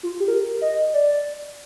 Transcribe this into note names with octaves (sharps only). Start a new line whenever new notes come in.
F4
G4
A#4
D#5
D5